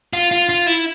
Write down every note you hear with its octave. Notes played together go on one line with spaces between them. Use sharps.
F4
F4
F4
E4